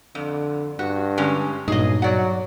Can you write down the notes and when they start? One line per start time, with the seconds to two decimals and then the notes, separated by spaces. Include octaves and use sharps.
0.15 F2 D3
0.79 G2 F#4
1.18 D3 G#3 C#4
1.68 B1 G2 A#2 D#4 G#4 D#5
2.02 F#3 D5 F#5